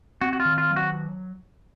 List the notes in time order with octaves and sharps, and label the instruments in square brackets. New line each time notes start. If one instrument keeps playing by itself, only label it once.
[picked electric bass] C4 [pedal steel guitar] F#4
[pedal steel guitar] F#4
F4
[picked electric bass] D#3
[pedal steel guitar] F4
[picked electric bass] F#3
[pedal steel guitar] F#4